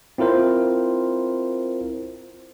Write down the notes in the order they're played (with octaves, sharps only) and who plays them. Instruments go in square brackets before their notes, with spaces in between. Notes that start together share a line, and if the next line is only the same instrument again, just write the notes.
[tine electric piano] C4 E4 F4 A#4 C5